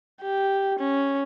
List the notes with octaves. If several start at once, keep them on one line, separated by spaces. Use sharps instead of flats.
G4
C#4